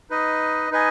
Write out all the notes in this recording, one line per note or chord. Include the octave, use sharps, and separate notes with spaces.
D#4 B4 D#5
D#4 B4 D#5 G#5